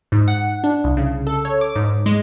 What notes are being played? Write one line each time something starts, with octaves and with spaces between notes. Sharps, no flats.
G#2
F#5
D4
C2
C#3
A4
C#5
D6
G#2
G#3